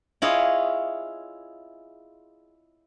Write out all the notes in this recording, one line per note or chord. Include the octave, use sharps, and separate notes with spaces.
E4 F4 G#4 C#5 D#5